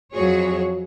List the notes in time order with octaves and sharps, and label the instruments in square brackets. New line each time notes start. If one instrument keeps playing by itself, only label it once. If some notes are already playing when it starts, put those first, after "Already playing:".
[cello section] F2 F#3 F#4 G#4 C#5